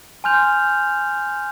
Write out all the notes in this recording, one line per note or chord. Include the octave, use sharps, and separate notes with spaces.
G#5 C6 F6 G6 F7